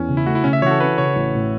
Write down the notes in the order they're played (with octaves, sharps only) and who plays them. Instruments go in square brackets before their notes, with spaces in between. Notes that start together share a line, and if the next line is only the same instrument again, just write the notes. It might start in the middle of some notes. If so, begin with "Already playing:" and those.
Already playing: [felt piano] E2 [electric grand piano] C#4
[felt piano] C#3
[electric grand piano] E4
[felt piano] A3 [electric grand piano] F#4
[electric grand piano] E4
[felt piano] C#3 [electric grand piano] C#4
[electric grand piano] E5
[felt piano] E3 [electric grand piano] C#5
[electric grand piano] F#4
A4
[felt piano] C#4 [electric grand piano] B4
[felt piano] C#3 [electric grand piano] C#5
[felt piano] A1
A2